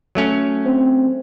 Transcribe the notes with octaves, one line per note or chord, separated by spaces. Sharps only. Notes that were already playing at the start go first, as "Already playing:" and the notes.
F#3 A3 C#4
C4